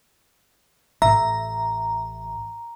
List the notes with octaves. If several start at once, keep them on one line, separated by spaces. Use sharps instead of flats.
A1 E5 A#5